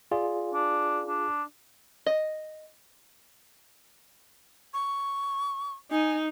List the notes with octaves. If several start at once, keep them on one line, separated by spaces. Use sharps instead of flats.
F4 G#4 D5
D4
D4
D#5
C#6
D#4 G#5